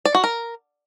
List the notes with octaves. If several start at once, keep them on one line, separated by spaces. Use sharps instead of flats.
D5
F#4
A#4